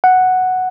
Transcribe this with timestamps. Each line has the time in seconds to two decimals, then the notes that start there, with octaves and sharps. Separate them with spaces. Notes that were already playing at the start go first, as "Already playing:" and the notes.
0.04 F#5